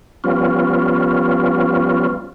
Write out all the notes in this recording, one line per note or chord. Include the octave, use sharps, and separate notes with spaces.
F3 G3 B3 C#4 F4